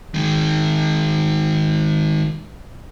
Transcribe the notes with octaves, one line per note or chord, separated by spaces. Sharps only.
D#3 G#3